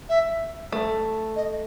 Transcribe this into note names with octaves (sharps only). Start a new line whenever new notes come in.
E5
A3
D#5